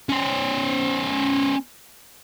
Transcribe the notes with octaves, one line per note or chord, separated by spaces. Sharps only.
C#4 C5